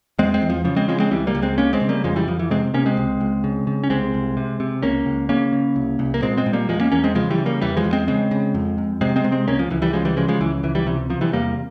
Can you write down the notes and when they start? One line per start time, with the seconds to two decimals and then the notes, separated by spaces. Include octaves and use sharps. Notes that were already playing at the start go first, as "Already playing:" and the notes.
0.19 E2 G#3 C4
0.34 G#3 C4
0.42 E2
0.50 F3
0.65 C#3 F3
0.76 G#3 C4
0.88 C#3 F3 G#3
1.00 G#3 C4
1.11 C#2 E3 G3
1.27 G3 A#3
1.35 C#2
1.42 G#3 C4
1.58 C#3 A#3 C#4
1.73 G#3 C4
1.81 C#3
1.89 G3 A#3
2.04 F2 F3 G#3
2.16 E3 G3
2.28 F2 F3
2.39 E3
2.50 C3 G#3 C4
2.74 C3 A#3 C#4
2.86 G#3 C4
2.97 C#2
3.20 C#2
3.44 C#3
3.67 C#3
3.84 C#4
3.90 C2 G#3 C4
4.14 C2
4.37 C3
4.60 C3
4.83 C#2 A#3 C#4
5.06 C#2
5.29 C#3 A#3 C#4
5.53 C#3
5.76 C2
5.99 C2
6.14 A#3
6.22 A#2 G#3 C4
6.37 G#3 C4
6.46 A#2
6.53 G3 A#3
6.68 E2 F3 G#3
6.80 A#3 C#4
6.92 E2 A#3 C#4
7.04 G#3 C4
7.15 C#3 F3 G#3
7.30 E3 G3
7.38 C#3
7.46 G3 A#3
7.61 E2 E3 G3
7.77 F3 G#3
7.85 E2
7.93 G#3 C4
8.08 C#3 G#3 C4
8.31 C#3
8.54 F2
8.78 F2
9.01 C3 G#3 C4
9.16 G#3 C4
9.24 C3
9.32 G#3 C4
9.47 C#2 A#3 C#4
9.59 F3
9.70 C#2 E3
9.82 E3 G3
9.93 C#3 F3 G#3
10.05 E3 G3
10.16 C#3 F3 G#3
10.28 F3 G#3
10.40 C#2 E3
10.63 C#2 E3
10.75 E3 G3
10.86 C3 E3
11.10 C3 F3
11.21 E3 G3
11.33 E2 G3 A#3